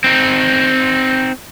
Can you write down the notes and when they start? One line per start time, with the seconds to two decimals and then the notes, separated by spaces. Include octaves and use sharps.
0.04 C4 D#4